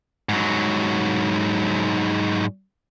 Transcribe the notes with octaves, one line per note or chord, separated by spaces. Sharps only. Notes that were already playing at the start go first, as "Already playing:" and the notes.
G#2 F#3